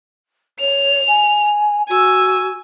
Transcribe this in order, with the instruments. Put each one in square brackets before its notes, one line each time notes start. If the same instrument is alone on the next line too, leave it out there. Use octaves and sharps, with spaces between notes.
[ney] C#5 [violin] F7
[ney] G#5
[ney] F#4 [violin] G#5 E6